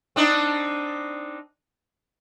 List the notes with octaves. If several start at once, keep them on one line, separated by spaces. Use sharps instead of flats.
C4 D4 D#4